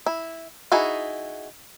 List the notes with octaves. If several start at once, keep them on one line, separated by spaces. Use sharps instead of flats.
E4
D#4 E4 F#4 G#4